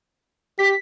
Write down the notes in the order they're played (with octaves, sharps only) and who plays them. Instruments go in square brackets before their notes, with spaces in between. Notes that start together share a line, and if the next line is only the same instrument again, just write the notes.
[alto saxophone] G4 [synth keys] B6